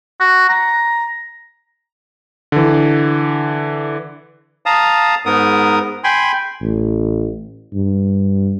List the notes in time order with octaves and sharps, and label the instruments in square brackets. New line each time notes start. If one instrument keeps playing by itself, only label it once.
[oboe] F#4
A#5
[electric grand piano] D3 E3
[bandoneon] F5 A5 A#5 D#6
G#2 B3 A#4 D#6
G5 G#5 B5 C6
[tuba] A1
G2